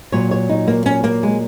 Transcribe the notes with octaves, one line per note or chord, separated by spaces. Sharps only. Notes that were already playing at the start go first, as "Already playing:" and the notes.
A#2 F#3 C#5
C#5
D#4
A#3
C#4
A#3
G#3